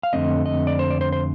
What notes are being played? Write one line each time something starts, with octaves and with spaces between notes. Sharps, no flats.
F5
F2 D3 A3 C4 D#5
D#5
D5
C5
D5
C5
C5